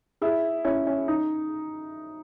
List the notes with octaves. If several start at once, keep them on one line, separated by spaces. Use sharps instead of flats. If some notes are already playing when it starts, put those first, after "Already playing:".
E4 G#4
C#4 E4
C#4
D#4